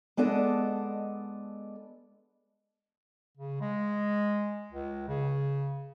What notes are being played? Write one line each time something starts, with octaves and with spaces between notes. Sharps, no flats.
G#3 B3 D4 A4 D5 D#5
C#3
G#3
C#2
C#3